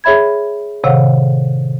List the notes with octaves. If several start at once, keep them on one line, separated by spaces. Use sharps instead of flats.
G#4 C#5 E5 B5 G#6
A2 C3 D#3 C#5 F5 F#5